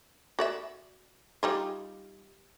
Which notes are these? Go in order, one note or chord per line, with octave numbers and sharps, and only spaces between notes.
F#4 D5 E5
G3 D#4 F4